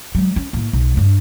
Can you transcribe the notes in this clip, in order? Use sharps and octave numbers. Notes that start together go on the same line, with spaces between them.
F#3 G#3
C#4
A2 A#3
B1
G2 D4